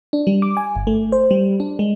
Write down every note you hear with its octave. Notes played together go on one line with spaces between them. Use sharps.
D4
G3
D6
G#5
G1
A3
C5
G3
D4
G#3